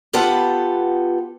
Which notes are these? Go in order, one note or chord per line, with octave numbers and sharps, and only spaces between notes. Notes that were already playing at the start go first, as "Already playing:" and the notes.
B3 F4 G4 A4 B4 F#5